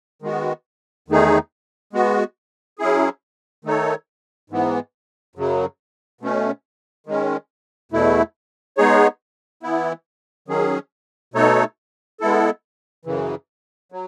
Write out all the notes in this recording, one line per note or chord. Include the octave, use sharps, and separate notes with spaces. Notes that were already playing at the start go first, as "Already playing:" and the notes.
D#3 G#3 B3 F#4
E2 D#3 A3 D#4 G#4
G#3 B3 F#4
F#3 C#4 E4 G#4
D#3 A3 D#4 A4 C#5
G#2 E3 B3
F#2 C#3 F#3
B2 A3 C#4
D#3 G#3 C#4
E2 B2 A3 E4
G#3 B3 D#4 G#4 C#5
E3 B3 E4
D#3 F#3 C#4 G#4
B2 A3 D#4 A4 C#5
G#3 B3 E4 A4
F#2 C#3 E3
F#3